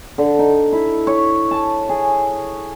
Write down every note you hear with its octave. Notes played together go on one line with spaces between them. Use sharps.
D3
D#4
E4
C#5
A5
G#4